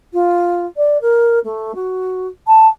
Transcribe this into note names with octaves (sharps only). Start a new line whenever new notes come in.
F4
D5
A#4
A3
F#4
A5